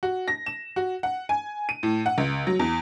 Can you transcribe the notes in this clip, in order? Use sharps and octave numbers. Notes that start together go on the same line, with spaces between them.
F#4
A#6
E7
F#4
F#5
G#5
D#7
A2
F#5
C#2
F#3
E2